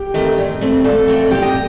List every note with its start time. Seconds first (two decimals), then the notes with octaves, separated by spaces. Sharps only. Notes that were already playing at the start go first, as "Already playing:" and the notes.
Already playing: G4 G5
0.14 D#3 A3 C4
0.38 A#2
0.61 A3 C4
0.84 A#2 A4 A5
1.08 A3 C4
1.31 A#2 G4 G5
1.42 D#5